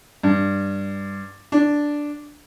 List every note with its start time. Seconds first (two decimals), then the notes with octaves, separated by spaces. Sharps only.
0.23 G2
1.52 D4